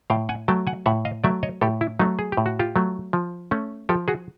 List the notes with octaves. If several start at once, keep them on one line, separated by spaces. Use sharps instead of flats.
A2 F5 G5
F#5 G#5
F#3 A3 G5 A5
F#5 G#5
A2 E5 F#5
D#5 F5
F#3 A3 D5 E5
C#5 D#5
A2 G4 A4
E4
F#3 A3 D#4
G#4
G4
A2
F#4
F4 G4
F#3 A3
F3
A3 C#4
F3 G4 A4
F#4 G#4